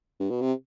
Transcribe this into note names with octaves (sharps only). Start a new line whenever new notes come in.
G2
B2
C3